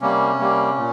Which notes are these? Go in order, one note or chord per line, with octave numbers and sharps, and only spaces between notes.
C3 G3 A#3 C#4
C3 G3 A#3
A#2